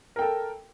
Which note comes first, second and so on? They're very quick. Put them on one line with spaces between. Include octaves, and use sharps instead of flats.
A#4 G5 A4